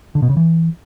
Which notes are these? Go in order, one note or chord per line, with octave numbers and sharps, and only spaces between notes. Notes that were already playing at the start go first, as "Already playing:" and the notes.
D3
B2
C#3
E3